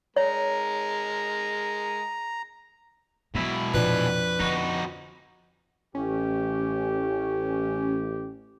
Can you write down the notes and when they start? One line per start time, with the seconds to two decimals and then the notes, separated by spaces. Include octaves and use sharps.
0.16 G#3 A#4 C#5 A#5
3.34 B2 F#3 G#3 E4
3.74 F2 A#2 D4 B4
4.40 D3 C4 D#4 F#4
5.95 A1 C#4 G4